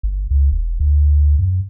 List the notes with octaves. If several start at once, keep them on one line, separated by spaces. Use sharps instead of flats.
G1
C#2
E1
D2
F#2